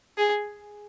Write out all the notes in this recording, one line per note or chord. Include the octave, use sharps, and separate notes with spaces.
G#4